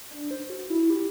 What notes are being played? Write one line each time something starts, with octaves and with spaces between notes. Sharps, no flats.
D4
C5
F#4
E4
G4